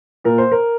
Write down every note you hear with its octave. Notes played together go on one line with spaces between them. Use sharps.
A#2 A#4
C5
A#4